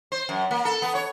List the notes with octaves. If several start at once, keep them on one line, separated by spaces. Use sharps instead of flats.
C5
F#2
A#3
A4
B3
C#5